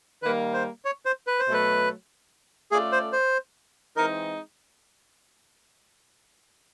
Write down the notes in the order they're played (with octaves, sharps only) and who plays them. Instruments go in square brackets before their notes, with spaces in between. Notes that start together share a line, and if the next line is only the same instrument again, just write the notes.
[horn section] D#3 G3 A#3 [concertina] B4
[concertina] C5
C#5
C5
B4
C5
[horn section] B2 F#3 A3
[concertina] B4
[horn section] A3 C#4 F4 A4 D5 [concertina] G#4
[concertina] C5
C5
[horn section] E3 G#3 C4 D#4 [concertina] A#4